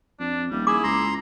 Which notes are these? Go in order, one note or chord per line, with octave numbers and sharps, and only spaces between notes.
F2 D4
D#1 G3
E4 G#4 D6
C#2 A#5 C6